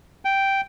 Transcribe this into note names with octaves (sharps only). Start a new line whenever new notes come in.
G5